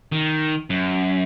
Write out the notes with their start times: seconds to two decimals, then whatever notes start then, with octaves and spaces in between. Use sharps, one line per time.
0.12 D#3
0.70 F#2